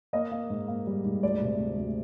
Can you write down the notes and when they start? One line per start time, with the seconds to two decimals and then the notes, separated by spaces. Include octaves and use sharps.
0.13 A#3 D#5
0.31 A#3
0.50 G#2
0.68 A#3
0.87 G3
1.05 G#2
1.23 D2 D5
1.42 C3
1.60 D2
1.78 D2